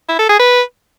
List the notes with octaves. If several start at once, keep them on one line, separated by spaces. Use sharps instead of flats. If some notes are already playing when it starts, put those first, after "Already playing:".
E4
A4
G#4
B4